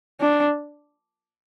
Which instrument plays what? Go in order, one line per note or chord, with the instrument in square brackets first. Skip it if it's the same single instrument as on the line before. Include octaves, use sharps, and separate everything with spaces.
[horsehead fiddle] D4